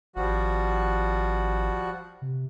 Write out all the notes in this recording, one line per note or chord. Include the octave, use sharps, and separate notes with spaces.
G#1 F3 G3 F#4
C3